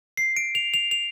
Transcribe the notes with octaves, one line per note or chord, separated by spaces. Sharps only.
C7
D7
F7
F7
F7